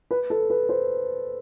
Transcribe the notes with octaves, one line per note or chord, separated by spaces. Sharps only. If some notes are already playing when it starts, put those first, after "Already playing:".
B4
A4
B4
C5